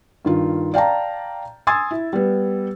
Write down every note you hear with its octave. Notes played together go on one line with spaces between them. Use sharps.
G2 D#3 F4
D5 F5 G5 A5 A#5
G#5 C6 D#6 E6 G#6 A6
E4
G3 B3